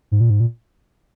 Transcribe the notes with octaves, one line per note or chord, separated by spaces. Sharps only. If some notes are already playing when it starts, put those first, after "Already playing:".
G#2
A#2
G#2
A#2